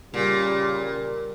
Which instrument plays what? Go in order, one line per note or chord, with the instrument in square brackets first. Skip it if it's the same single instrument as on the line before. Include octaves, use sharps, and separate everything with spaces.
[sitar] A#2 [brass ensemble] C#3 G3